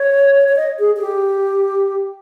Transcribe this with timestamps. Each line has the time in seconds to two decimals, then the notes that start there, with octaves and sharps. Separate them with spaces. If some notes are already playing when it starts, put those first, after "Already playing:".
Already playing: C#5
0.49 C#5
0.56 D#5
0.79 G#4
0.96 G#4
1.01 G4